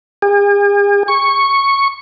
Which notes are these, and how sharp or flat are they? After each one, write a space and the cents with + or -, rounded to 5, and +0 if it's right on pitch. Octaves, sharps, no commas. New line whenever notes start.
G#4 -45
C#6 -5